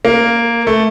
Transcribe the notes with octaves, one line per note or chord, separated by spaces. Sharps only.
A#3
A3